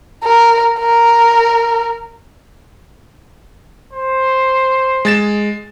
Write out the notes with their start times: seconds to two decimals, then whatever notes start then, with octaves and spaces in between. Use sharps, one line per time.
0.24 A#4
0.79 A#4
3.93 C5
5.05 G#3 A6 E7